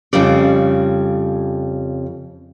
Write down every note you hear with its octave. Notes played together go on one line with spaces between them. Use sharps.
F2 C#3 G3 D5